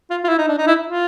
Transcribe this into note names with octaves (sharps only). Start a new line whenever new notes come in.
F4
F4
E4
D#4
D4
D#4
E4
F4